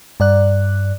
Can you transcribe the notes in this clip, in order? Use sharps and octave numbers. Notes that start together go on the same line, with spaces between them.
G2 D5 F#6